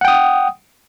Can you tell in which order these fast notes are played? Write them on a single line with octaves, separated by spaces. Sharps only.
F#5 G5 D#6